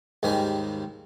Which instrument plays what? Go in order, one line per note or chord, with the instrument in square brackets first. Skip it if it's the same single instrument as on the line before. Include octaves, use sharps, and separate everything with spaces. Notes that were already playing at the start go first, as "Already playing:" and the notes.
[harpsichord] D#2 G#2 D#3 G3 G#5